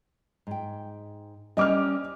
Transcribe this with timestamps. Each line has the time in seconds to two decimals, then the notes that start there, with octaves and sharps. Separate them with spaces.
0.47 G#2 G5
1.57 G3 C#4 C5 D#5 D6 F6